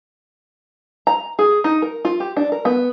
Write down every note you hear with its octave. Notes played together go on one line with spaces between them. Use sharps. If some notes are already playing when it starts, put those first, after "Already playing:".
A#5
G#4
D#4
A#4
F4
G4
D4
A#4
B3